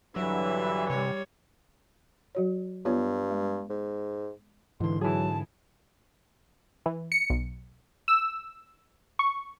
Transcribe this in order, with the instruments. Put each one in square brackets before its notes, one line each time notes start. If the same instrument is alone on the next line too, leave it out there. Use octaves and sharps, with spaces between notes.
[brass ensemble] G2 D3 E3 [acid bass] F#3 [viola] E5
[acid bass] C3 [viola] G3 C#5
[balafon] F#3 F#4 C#5
[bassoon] G2 [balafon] B3 F4 C#5
[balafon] G#3
[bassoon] G#2
[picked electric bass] G#2 D3 [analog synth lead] E3 [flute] C6
[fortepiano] E3 G#4 [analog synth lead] F#3 [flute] A5
[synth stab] E3
C#7
B1
E6
C#6